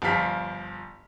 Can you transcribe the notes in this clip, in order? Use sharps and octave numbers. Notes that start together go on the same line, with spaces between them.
G1 F3 G4 F5 B6